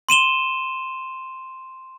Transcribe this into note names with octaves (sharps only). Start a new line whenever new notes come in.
C6 D#7 E7 G7